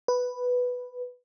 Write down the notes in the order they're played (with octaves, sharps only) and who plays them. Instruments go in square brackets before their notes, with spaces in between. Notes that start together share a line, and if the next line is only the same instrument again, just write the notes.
[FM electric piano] B4